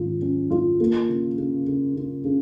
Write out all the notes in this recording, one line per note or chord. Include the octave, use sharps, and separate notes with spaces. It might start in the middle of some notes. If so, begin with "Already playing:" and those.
Already playing: G#2 D#3 C#4 F4
C#4
F4
A#3
C#3
C#3
C#3
C#3
C#3